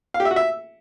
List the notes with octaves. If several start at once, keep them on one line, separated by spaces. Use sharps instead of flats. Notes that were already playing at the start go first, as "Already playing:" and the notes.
F5
G4
E5
F#4
E5